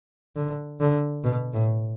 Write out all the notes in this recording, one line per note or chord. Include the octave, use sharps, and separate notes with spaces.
D3
D3
B2
A2